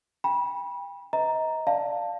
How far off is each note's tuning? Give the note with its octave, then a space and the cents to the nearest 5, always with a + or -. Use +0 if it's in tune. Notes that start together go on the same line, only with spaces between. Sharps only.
G5 +35 B5 -25
B4 +20 D#5 +30 A#5 +0
D5 +0 F5 +0 A5 +10